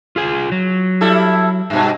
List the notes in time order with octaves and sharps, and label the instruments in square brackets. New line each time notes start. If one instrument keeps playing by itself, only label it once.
[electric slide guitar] F4 G#4 G#5
F#3
[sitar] G3 E4 A4
G2 B2